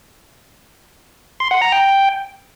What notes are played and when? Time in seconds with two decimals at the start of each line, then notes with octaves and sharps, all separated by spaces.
1.40 C6
1.51 F#5
1.62 A#5
1.72 G5